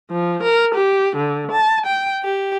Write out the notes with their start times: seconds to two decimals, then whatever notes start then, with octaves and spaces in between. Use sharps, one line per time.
0.11 F3
0.42 A#4
0.74 G4
1.17 D3
1.50 A5
1.86 G5
2.23 G4